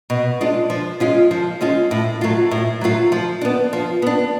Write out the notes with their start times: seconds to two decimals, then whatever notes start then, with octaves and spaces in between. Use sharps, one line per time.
0.10 B2
0.41 G#3 D4 F4
0.70 F3
1.00 G#3 C#4 F4
1.31 F3
1.61 G#3 C#4 F4
1.91 A2
2.21 F#3 A3 F4
2.51 A2
2.81 F#3 A3 F4
3.12 F3
3.41 B3 D4
3.73 F3
4.02 B3 D4